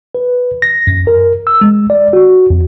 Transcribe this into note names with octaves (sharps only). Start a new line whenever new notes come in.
B4
A#6
F#2
A#4
E6
G#3
D5
F#4
F2